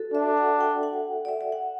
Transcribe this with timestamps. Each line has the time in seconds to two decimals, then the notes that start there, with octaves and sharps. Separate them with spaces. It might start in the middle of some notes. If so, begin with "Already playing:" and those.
Already playing: F#4 A4
0.14 D4 E5
0.37 F#5
0.60 G5
0.83 F#5
1.25 D5
1.29 E5
1.41 E5
1.52 F#5